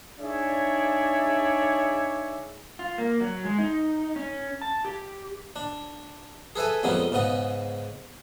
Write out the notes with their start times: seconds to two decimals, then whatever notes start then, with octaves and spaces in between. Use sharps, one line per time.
0.20 D4 D#4 G#4 C#5 D5 E5
2.79 F4
2.98 A#3
3.21 F#3
3.45 G#3
3.58 D#4
4.16 C#4
4.62 A5
4.85 G4
5.56 D4
6.56 G#4 A4 B4 E5 G#5
6.83 F2 G3 G#3 B3 C#4 D#4
7.12 G#2 C#3 B3 D#5 D#6